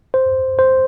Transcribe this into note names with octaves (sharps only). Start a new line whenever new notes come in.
C5
C5